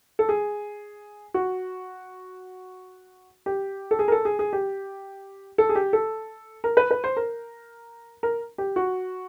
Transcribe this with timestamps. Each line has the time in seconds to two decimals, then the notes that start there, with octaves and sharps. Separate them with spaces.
0.19 A4
0.29 G#4
1.34 F#4
3.46 G4
3.91 A4
3.99 G#4
4.08 A#4
4.12 A4
4.25 G#4
4.39 G#4
4.53 G4
5.58 A4
5.69 G#4
5.75 G4
5.93 A4
6.64 A#4
6.77 B4
6.91 B4
7.04 C5
7.17 A#4
8.23 A#4
8.58 G4
8.76 F#4